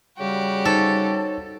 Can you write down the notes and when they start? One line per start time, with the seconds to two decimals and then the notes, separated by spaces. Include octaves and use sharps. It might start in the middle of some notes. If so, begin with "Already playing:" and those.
0.19 C#3 G3 F#4 G4
0.65 D#4 A4 C5 C#5